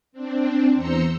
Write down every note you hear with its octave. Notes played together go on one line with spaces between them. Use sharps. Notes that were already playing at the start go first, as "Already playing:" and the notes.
C4 D4
E2 C5 A#5 C6 E6 C#7